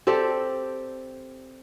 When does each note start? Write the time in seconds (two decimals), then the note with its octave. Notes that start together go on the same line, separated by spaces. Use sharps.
0.07 C4 G4 A4 D5